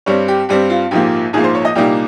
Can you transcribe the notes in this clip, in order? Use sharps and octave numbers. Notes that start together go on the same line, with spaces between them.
G2 G3 C4 C#5
G4
G2 G3 C4 G4
F4
A#1 G#2 F3 A#3 G4
A#1 G#2 F3 A#3 G#4
C5
C#5
D#5
C2 A#2 G3 A#3 D#4 G4